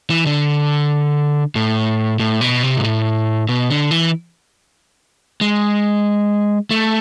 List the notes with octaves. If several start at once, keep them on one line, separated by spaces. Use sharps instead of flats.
E3
D3
A2
A2
B2
C3
G#2
A2
B2
D3
E3
G#3
A3